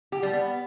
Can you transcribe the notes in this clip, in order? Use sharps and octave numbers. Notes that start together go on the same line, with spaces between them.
G4
G3
B3